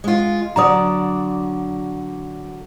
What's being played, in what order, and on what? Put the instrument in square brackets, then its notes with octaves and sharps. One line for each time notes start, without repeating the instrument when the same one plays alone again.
[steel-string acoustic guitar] G#3 F4
[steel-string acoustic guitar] D3 F#3 D5 [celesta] A#5 D#6